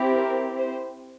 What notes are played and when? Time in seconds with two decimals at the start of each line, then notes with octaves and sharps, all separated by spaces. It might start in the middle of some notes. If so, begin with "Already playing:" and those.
Already playing: C4 E4 G4
0.15 A#4
0.58 C5